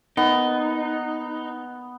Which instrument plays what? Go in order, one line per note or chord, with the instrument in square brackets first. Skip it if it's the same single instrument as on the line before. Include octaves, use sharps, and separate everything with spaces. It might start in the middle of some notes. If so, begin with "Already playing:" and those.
[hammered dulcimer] B3 [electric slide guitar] D#4